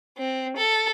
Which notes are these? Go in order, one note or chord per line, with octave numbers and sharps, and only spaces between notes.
C4
A4